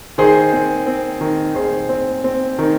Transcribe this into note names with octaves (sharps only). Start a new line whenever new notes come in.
D#3 G#4 C5
C4
C4
D#3
D#3 G#4 C5
C4
C4
D#3